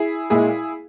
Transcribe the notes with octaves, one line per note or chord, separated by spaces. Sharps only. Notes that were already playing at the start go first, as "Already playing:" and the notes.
Already playing: E4 G#4
A#2 G#3 E4 G#4